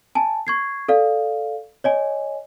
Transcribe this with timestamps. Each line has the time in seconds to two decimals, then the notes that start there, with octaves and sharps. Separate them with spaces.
0.15 G#5 A5
0.47 C#6 G#6 C7
0.88 A4 D5 F5
1.84 C#5 D#5 G#5